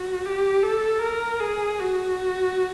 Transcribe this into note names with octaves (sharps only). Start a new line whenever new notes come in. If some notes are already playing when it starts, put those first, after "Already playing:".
Already playing: F#4
G4
A4
A#4
G#4
F#4